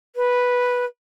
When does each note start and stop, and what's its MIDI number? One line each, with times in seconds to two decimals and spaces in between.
0.16 0.85 71